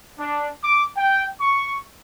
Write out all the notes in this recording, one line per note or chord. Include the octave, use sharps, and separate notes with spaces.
D4
D6
G5
C#6